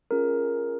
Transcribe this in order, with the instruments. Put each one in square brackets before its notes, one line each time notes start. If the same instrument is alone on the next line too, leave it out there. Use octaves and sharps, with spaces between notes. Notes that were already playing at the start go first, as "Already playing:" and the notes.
[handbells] C#4 F4 G#4 A#4